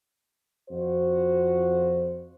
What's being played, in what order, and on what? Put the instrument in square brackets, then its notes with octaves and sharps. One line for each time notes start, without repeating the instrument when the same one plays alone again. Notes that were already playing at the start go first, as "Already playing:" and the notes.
[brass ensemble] F2 F#4 C5